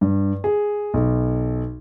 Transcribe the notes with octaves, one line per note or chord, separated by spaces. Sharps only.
G2
G#4
B1